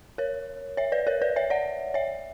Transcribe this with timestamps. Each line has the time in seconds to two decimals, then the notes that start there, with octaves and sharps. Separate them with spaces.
0.18 A#4 C#5
0.77 C#5 E5
0.92 B4 D5
1.07 A#4 C#5
1.22 B4 D5
1.36 C#5 E5
1.50 D5 F#5
1.94 C#5 E5